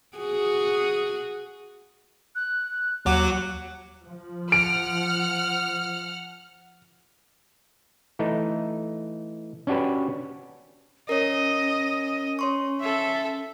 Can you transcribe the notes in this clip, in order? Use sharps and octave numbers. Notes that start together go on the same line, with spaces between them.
F#4 G#4
F#6
D#2 F#3 F#5 D6
F3
F#5 F6 D7
E3 A3 D#4
C#4 D4 F#4 G4 B4
C#4 A#4 C#5 D#5
C#5 C6 C#6
A4 E5